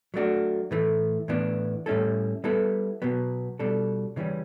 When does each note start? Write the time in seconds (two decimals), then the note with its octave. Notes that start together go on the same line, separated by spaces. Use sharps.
0.14 F#3 A3 D4 F#4
0.71 A2 E3 A3
1.28 A2 E3 B3 D4
1.86 A2 G3 C#4 E4 A4
2.44 G3 B3 E4 A4
3.02 B2 F#3 B3
3.59 B2 G3 D4 A4
4.16 C#3 E3 G3 C#4